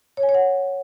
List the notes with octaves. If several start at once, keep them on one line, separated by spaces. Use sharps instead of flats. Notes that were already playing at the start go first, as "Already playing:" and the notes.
C#5
G#5
C#5
F#5